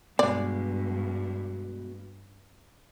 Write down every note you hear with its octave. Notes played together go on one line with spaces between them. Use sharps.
G2 B2 G#3 D5